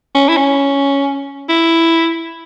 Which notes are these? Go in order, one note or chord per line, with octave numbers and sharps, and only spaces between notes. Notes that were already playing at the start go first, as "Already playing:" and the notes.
C#4
E4
C#4
E4